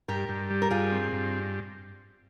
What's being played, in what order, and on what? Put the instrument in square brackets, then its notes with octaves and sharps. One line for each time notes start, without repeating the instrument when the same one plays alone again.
[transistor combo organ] G2 [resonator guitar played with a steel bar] G4 A#4
[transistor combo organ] G2
G3
[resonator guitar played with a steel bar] A#4
[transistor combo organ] G2 [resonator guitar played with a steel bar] F4 G#4
[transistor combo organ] C4
G2